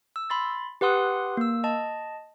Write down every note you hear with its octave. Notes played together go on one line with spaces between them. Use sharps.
E6
B5 C6 A6
G4 B4 F#5 C6 D#6 F#6
A#3 E6
D#5 A5